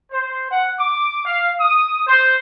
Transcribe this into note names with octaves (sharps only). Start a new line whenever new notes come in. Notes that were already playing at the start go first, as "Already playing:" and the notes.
C5
F#5
D6
F5
D#6
C5